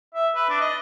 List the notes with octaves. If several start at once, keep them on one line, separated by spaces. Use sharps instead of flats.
E5
B4
D4
D#5